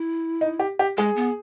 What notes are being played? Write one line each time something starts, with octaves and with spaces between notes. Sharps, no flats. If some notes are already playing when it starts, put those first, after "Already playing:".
Already playing: E4
D#4
G4
G4
G#3 G#4
B3